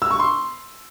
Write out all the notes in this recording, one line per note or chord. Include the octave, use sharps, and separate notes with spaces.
E6
C#6
C6